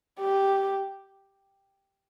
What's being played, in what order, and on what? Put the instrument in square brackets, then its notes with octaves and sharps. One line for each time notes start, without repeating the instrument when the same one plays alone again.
[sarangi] G4